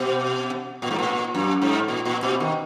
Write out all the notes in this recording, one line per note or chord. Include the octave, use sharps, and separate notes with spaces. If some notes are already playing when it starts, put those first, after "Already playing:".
Already playing: B2
A#2
G#2
A#2
F#2
G#2
A#2
A#2
B2
D#3